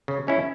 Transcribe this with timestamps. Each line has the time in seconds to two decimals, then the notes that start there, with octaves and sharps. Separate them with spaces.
0.08 C#3
0.27 G#3 C#4 E4